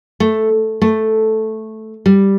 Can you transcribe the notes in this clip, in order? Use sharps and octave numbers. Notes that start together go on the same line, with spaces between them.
A3
A3
G3